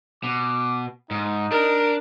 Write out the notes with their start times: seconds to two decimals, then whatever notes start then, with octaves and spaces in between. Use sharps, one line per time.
0.24 B2 D6
1.11 G#2 D#4
1.52 D4 A#4